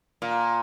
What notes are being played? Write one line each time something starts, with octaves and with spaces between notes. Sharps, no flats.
A#2